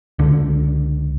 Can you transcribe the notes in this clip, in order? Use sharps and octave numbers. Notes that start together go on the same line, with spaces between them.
C#2 D3